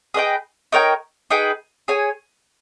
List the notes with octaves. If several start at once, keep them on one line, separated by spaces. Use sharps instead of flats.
G#4 B4 D#5 G5
D#4 A#4 C#5 G5
D#4 G#4 B4 G5
G#4 C#5 G#5